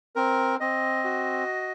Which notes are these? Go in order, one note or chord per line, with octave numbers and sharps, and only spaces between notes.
C4 A#4
C4 D#5
F#4